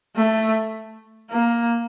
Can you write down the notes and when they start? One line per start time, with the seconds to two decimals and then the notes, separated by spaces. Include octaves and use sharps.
0.16 A3
1.31 A#3